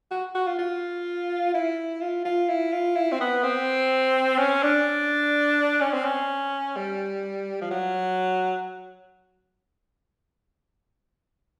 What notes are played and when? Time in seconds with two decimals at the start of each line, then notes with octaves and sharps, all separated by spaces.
0.11 F#4
0.35 F#4
0.47 F4
0.58 F4
1.54 E4
2.01 F4
2.25 F4
2.49 E4
2.72 F4
2.96 E4
3.12 C4
3.20 B3
3.44 C4
4.39 C#4
4.63 D4
5.81 C#4
5.93 C4
6.05 C#4
6.76 G3
7.61 F3
7.71 F#3